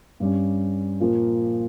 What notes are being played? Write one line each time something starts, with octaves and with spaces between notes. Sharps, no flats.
G2 G3 C#4
A#2 F3 A#3